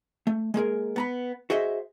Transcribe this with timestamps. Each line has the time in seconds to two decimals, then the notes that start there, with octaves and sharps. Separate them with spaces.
0.27 A3
0.54 G#3 A#3 G#4 A#4
0.96 B3 A#5 B5
1.50 F#4 G#4 C5 D#5 E5